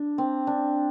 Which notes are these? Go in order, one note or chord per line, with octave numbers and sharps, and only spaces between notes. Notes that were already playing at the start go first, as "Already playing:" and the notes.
Already playing: D4
C4
D4